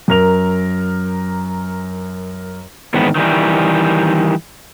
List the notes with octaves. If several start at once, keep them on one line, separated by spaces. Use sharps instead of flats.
F#2 A#4 F7
E2 G#2 D#3 B3
D#3 E3 G3